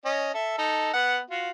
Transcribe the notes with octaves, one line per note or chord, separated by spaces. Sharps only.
C#4 D#5
A4 E5
D#4 A4
B3 F#5
F4 F#4